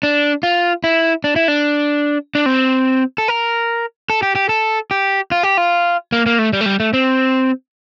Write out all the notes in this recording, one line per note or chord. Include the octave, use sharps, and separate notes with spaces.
D4
F4
E4
D4
E4
D4
D4
C4
A4
A#4
A4
G4
G4
A4
G4
F4
G4
F4
A#3
A#3
A3
G3
A3
G3
A3
C4